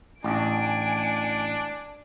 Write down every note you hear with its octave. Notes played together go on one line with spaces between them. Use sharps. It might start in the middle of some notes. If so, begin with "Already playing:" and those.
A1 D4 G#5 D7